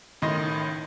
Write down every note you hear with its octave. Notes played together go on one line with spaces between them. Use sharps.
A1 A2 D#3 D#5 C6 A#6